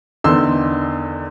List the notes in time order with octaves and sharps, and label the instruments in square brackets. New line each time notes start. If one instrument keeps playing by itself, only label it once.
[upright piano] E2 D3 D#3 C6 E6